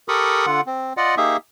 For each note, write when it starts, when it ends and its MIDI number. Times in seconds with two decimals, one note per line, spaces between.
0.08 0.46 67
0.08 0.46 69
0.08 0.46 70
0.08 0.46 83
0.08 0.46 85
0.08 0.46 87
0.46 0.61 50
0.46 0.61 65
0.46 0.61 78
0.67 0.93 60
0.97 1.15 65
0.97 1.15 74
0.97 1.15 75
0.97 1.15 78
1.17 1.37 58
1.17 1.37 63
1.17 1.37 67
1.17 1.37 68
1.17 1.37 76